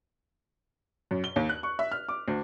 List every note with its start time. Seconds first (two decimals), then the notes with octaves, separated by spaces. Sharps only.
1.11 F#2
1.24 G7
1.36 D#2
1.49 F#6
1.63 C#6
1.79 E5
1.92 F6
2.09 D6
2.28 D2